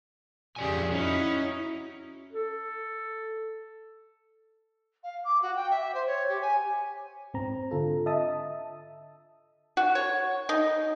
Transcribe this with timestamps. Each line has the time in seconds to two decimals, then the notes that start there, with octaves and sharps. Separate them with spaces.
0.56 F2 C#3 G4 G#4 D5 G#5
0.92 C#4 D#4 E4 F#4
2.33 A4
5.03 F5
5.24 D6
5.42 F#4
5.55 G5
5.70 E5
5.94 C5
6.07 C#5
6.28 G4
6.41 G#5
7.34 G#2 C4 A#5
7.71 D3 F4 A4
8.06 D#5 E5 A5 D#6
9.77 F#4
9.95 C#5
10.49 D#4